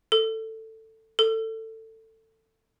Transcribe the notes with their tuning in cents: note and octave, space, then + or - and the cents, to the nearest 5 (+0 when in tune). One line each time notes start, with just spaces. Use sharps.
A4 +15
A4 +20